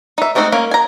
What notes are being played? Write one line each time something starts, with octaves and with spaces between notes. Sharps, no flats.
D#4 E5
G#3 A3 C4 D#4 F#4
A#3 C#4
G#5 A#5